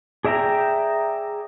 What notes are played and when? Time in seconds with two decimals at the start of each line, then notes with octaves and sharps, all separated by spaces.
0.25 G#4 D5 E5 G5 A#5